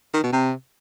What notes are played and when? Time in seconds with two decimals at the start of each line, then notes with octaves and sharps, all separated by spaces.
0.14 D#3
0.23 B2
0.32 C3